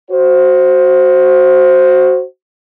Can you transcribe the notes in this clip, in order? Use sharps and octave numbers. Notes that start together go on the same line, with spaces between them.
F#4 C5